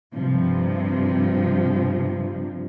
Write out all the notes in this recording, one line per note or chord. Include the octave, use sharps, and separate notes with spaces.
G2 C3 F3